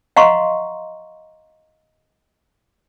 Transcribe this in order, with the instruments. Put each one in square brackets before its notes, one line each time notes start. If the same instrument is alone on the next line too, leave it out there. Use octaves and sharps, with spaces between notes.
[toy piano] D#5 F5 F#5 A#5 C6 C#6